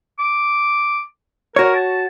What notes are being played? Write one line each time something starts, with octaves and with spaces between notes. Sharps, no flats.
D6
F#4 A#4 C#5
A5